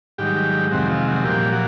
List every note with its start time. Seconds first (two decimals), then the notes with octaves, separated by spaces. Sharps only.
0.18 G#2 D#3 F#3 G3 G4
0.71 F2 C3 D#3 F#3 G#3 C4 F#4
0.90 F4
1.07 F#3 F#4
1.25 A#2 F3 G3 A#3 G4
1.52 F#3 F#4